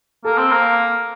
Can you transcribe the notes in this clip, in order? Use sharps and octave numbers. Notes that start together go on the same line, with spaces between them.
A#3 A4
C4
A#3